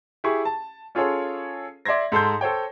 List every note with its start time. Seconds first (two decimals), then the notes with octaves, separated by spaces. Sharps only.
0.24 E4 G4 G#4 C#6
0.45 A5
0.95 C#4 F4 G#4 A4 C#5
1.85 D5 E5 C6 G#6 A#6
2.12 G#2 A4 C6 G6
2.41 A4 C5 C#5 G5